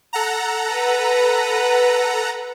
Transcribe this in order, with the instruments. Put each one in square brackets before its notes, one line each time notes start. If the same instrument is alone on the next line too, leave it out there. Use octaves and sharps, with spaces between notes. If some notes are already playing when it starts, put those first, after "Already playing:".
[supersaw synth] A4 F#5 A#5
[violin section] B4